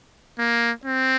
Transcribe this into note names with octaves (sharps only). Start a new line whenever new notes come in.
A#3
C4